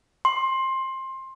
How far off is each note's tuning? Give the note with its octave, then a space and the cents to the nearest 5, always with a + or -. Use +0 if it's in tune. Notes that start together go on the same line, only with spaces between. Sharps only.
C6 +20